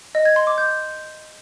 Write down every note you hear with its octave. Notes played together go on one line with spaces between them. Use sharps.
D#5
G#6
C6
D6
G6